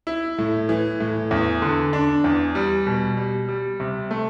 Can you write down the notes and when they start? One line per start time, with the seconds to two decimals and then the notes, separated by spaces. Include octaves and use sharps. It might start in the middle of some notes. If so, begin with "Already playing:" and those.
0.07 E4
0.38 A2
0.69 E3
1.00 A2
1.31 E2
1.62 D3
1.93 D4
2.24 E2
2.55 G3
2.87 B2
3.17 G3
3.49 G3
3.80 C3
4.11 A3